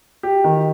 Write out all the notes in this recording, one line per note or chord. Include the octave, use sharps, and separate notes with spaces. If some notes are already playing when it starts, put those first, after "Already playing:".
G4
D#3